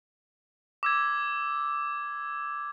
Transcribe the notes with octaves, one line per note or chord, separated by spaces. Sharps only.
D6 E6 G#6